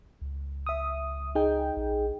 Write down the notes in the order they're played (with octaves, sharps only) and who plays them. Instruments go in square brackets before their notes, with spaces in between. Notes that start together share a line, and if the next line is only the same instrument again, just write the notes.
[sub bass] C#2
[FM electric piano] E5 D#6
D#4 G#4 G5
[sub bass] A#1